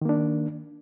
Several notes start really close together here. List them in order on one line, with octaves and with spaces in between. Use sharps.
D#3 A#3 D4